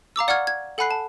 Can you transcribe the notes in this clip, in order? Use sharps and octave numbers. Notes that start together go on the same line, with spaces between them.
F5 A#5 D6 E6
D5 F#5 C#6 F6 G#6
G#6
A4 F#5 G#5 B5 F#6 C7
A5